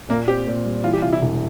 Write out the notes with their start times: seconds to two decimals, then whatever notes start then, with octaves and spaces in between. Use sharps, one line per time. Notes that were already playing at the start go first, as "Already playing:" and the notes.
0.09 A#2 A#3
0.28 C4 G4
0.47 A#2
0.65 G3
0.84 E3 F4
0.93 G4
1.02 C3 F4
1.13 E4
1.22 E1